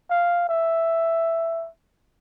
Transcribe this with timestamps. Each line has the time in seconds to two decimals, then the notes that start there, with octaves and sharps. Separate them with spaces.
0.10 F5
0.49 E5